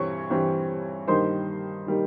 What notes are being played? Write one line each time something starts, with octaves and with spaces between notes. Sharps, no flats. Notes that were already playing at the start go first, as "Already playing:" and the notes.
Already playing: G2 E3 G3 C4 C#5 C#6
G2 E3 G3 C4
G2 D#3 G3 A#3 D#4 C5 C6
D#3 G3 A#3 D#4